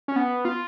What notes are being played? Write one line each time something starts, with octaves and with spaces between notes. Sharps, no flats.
C#4
B3
F4